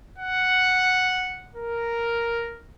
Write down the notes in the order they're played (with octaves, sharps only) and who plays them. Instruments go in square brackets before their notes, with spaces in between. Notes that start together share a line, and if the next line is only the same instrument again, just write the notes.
[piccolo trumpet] F#5
A#4